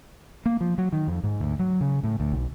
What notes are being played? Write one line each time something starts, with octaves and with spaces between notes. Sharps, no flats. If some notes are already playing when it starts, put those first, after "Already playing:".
A#3
F3
F#3
D#3
F2
G#2
D2
F#3
C#3
A2
D2
B1